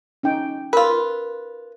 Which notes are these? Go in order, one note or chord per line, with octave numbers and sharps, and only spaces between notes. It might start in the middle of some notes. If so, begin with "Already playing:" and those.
C#4 D#4 G5
F4 A#4 B4 C6